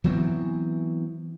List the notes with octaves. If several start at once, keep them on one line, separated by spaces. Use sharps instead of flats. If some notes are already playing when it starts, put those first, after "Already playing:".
E3 F#3 B3 C4